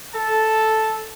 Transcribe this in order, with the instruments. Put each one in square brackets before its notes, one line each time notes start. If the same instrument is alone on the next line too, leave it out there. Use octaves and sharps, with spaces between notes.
[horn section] A4 [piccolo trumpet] A5